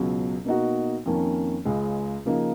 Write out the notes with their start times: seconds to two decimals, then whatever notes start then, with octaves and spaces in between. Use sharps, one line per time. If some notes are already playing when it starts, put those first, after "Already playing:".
Already playing: C#2 B2 F#3
0.45 B2 A#3 D#4 F#4
1.06 F2 D#3 A#3 C#4
1.65 C#2 C#3 G#3
2.25 C#3 F3 A#3 D#4